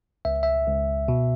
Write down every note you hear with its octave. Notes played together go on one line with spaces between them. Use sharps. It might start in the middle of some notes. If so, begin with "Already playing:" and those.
C#2 E5
E5
C#2
B2